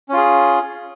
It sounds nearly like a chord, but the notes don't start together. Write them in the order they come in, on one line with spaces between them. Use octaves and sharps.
C#4 F4 G#4